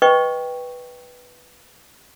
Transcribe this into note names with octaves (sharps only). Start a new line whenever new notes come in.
B4 D#5 G5 C#6